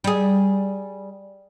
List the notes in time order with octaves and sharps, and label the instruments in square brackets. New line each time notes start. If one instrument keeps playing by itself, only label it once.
[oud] G3 G#4